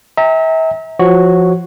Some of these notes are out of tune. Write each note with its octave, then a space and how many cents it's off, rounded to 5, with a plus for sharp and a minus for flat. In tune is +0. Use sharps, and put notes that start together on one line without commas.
E5 -35 G5 +35 A#5 -20
F3 -5 F#4 +0 C#5 +0